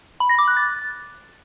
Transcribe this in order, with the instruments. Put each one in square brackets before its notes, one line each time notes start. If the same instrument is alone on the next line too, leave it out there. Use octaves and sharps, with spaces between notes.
[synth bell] B5
A#6
D6
F#6
A6